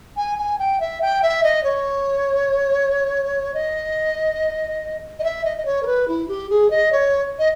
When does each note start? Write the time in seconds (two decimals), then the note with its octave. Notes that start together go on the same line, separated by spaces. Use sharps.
0.17 G#5
0.38 G#5
0.59 G5
0.80 E5
1.01 G5
1.22 E5
1.43 D#5
1.64 C#5
3.54 D#5
5.19 D#5
5.23 E5
5.44 D#5
5.57 D#5
5.65 C#5
5.83 A#4
5.86 B4
6.08 E4
6.28 G4
6.50 G#4
6.70 D#5
6.92 C#5
7.39 D#5